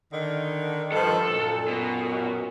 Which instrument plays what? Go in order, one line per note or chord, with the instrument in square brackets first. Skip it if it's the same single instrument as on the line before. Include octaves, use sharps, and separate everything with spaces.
[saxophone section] D3 D#3
[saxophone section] G2 D#3 F3 [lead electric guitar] A4
[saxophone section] F#2 A#2
[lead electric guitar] B2